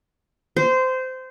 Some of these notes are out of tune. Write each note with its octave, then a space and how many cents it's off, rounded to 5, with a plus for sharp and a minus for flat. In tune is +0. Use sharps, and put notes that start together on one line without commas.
C5 -20